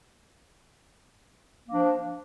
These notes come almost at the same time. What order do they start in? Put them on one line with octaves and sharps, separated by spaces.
A#3 D4 F3